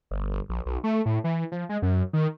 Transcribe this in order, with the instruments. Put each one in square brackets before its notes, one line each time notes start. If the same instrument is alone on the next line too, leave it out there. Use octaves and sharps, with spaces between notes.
[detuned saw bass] G1
A#1
B1
A3
A2
E3
F3
G#3
F#2
D#3